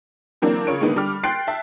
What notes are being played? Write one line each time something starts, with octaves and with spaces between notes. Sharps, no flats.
D3 E3 F#3 A#3 C4 D4
C#3 F4 C#5 D7
A2 D3 D#3 G#3 A#3 B3
D3 G3 D6 F6
G5 C6 F#6 A6 C7 D7
E5 G5 A5